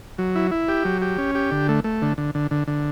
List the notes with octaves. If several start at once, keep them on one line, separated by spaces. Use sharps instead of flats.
F#3
E4
E4
G4
F#3
G4
C#4
G4
D3
A3
A3
D3
D3
D3
D3
D3